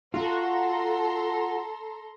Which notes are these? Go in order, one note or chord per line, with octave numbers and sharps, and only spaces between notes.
F4 F#4 A4 A#5 C6